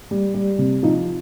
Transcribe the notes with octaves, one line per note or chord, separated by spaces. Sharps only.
G3
G3
C3
F3 D#4